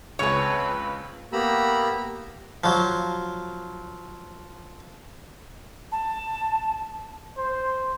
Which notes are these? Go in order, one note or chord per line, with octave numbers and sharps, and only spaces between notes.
C#2 C4 B4 C#5 A5 C#6
A#3 B3 G4 A#5 B5 E6
F3 F#3
A5
C5